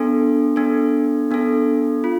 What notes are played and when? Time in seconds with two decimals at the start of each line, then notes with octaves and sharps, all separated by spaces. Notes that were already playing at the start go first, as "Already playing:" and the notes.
Already playing: B3 D4 A4
0.56 B3 D4 A4
1.31 B3 D4 A4
2.04 F4